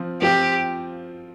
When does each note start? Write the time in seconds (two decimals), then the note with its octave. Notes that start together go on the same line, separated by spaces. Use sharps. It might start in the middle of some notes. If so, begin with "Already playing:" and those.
Already playing: F3 C4 F4
0.21 F3 C4 F4 G4